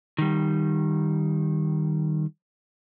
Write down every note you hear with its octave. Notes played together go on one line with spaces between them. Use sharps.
D#3 G3